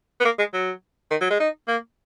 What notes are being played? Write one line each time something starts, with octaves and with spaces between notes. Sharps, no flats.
B3
A#3
G#3
F#3
D#3
F#3
G#3
D#4
A#3